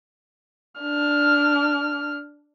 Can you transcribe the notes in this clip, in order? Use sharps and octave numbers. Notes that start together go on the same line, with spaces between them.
D4 F6